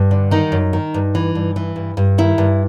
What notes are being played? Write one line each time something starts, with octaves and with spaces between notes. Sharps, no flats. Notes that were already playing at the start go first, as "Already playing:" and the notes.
Already playing: G2
D3
D#3 D#4
F#2
D#3
G2
E3
G2
E3
G2
G2
D#3 E4
G2